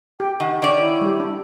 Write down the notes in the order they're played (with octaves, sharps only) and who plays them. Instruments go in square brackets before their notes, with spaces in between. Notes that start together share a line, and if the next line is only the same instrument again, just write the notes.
[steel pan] G4 [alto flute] G5
[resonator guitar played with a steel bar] D#3 [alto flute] F#5
[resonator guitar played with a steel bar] D#3 C#4 D5
[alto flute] E4
[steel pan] G3 G4
D4